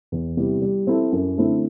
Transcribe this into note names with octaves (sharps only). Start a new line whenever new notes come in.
E2
C3 G3 B3 E4
G3
C4 E4 A4
F#2
D3 A3 C4 E4